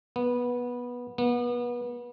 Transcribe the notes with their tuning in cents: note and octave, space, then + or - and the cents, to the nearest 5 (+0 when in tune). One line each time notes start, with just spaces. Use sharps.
B3 -15
B3 -30